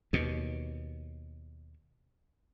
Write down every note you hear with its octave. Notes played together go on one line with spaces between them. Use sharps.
D#2 B2